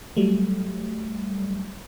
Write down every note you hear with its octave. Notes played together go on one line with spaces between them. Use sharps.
F#3 G3 A3